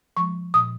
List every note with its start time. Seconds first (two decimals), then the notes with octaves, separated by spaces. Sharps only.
0.17 F3 G#3 C#6
0.54 A#2 D#6